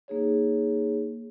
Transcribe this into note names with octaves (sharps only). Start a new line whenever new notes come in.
A#3 D#4 G#4 C#5